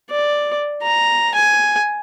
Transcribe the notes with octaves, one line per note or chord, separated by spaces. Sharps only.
D5
A#5
G#5